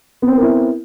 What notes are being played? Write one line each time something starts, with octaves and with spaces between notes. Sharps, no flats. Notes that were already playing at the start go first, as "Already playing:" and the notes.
B3 C4 E4 A#4 B4